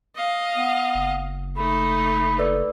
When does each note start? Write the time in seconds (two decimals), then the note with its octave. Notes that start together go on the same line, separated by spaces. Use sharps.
0.16 D#5 F5
0.57 B3
0.95 F#1
1.57 A3 D#4 B5
2.38 A4 B4 D5